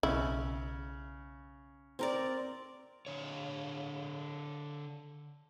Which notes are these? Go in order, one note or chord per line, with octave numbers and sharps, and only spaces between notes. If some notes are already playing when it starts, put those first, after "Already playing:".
B1 C#3 E4
C4 A#4 D5
D3 C#5